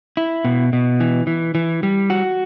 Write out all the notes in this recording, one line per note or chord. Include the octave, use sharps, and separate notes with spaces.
E4
B2
B2
E3
E3
E3
G3
F#4